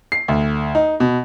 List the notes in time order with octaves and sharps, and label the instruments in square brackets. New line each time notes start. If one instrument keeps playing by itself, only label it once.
[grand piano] C7
D2
D#4
B2